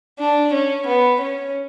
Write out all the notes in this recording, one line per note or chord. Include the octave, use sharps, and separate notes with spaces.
D4
C#4
B3
C#4